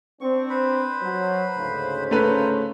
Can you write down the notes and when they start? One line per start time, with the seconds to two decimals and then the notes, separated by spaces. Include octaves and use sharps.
0.20 C4 D4 C#6
0.50 B4 C5 B5
1.02 F#3
1.56 D2 G#2 C#3
2.11 A3 C#4 F4 B4 C5 A#5